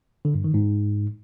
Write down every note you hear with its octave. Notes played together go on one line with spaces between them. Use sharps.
D3
G2
D#3
G#2